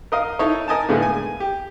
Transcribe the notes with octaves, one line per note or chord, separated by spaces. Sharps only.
A#4 D#5 F5
D#4 E4 A4 C#5
A#4 D#5 G#5 A5
A2 D3 G#3 A#3 B3
G#5
G4